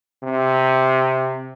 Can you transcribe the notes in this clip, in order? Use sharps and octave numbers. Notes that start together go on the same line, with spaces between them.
C3